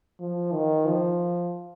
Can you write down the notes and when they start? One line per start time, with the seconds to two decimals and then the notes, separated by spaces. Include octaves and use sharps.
0.20 F3
0.53 D#3
0.87 F3